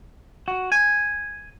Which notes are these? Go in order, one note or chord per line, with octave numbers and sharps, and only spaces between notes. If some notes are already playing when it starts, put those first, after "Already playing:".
F#4
G#5